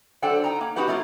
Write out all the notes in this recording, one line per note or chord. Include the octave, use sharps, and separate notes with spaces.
F#3 D4 A4 C5 F#5 G5
D#4 G5 A#5
A#3
C4 D#4 F#4 G4 B4 F#5
F#3 A3 A#3 E4 F4